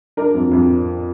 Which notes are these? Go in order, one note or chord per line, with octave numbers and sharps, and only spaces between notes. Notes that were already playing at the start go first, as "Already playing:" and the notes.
D4 A#4
F2
F2